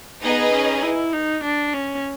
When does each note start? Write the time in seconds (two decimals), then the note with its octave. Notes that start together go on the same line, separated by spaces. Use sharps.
0.23 B3 D#4 G#4 B4 D#5
0.53 C#4
0.83 E4
1.13 D#4
1.44 D4
1.74 C#4